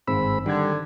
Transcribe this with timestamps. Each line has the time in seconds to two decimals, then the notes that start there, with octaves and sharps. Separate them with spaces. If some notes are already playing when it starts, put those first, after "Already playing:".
0.07 G1 G#2 D#3 C4 B5 E6
0.46 D3 D#3 G3 G#6